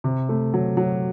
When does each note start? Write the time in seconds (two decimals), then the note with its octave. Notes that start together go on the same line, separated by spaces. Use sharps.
0.04 C3
0.29 A3
0.54 F#3
0.77 F#3